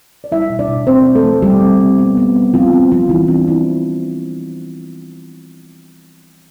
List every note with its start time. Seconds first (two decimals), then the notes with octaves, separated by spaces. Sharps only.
0.24 D5
0.32 G3 E4 E5
0.50 B2
0.59 D4 D5
0.69 B2
0.87 C4 C5
1.06 C4
1.15 A3 A4
1.24 F3
1.42 G3 G4
1.62 C4
1.81 C4
1.98 B3
2.17 B3
2.36 G3
2.54 F3 C4 F4
2.73 C4
2.91 F3 C4 F4
3.09 E3 G3 E4
3.28 C4 D4
3.46 E3 C4 E4